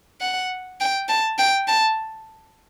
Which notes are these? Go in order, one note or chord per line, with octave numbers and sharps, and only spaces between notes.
F#5
G5
A5
G5
A5